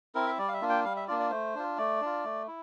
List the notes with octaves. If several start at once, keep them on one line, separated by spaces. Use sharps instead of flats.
C4 E4 A#4
E5
G3 D5
F5
E5
A#3 D4 F4
G5
G3 F5
E5
A#3 D4 F4 D5
D5
A3 C5
D4 F4
A3 D5
D4 F4
A3
E4